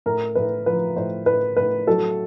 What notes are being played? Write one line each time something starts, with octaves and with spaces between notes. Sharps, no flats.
A2 A#4
A2 B4
F3 B4
A2 C5
A2 B4
A2 B4
F#3 A4